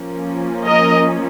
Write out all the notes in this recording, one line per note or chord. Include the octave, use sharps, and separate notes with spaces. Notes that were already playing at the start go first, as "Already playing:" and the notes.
Already playing: F3 A#3 C#4
A#4 D#5